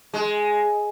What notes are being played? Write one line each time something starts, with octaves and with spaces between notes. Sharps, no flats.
G#3